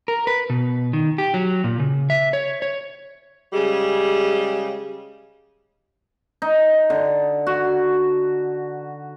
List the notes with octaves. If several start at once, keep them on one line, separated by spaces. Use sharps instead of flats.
A#4
B4
B2
D#3
G4
F#3
A#2
C#3
E5
C#5
C#5
C#3 G3 G#3
D#4
D3
F#4